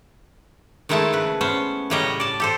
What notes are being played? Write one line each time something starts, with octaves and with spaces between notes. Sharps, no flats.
D#3 G#3 A3 E4 G#4 A5
C#3 B4
B3 C#4 C5
A2 C#3 G3 C#4 D#5 A#5
D5 A5
G4 A4 C5